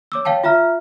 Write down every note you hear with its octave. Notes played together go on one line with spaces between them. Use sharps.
C#5 D6 E6
C#5 F5 G5 A5
F4 E5 A#5 F6